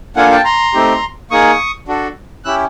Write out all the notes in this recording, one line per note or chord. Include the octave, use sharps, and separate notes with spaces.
A#3 D4 F4 A4 F#5 G#5
G5 A5
A#5 C6
A3 C4 D#4 G4
A#3 D#4 G#4 C#6 D#6
D4 F#4 A4
C#4 E4 G4 E6 F#6